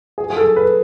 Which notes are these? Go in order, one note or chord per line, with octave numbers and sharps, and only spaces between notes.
G#4
G#4
A4
B4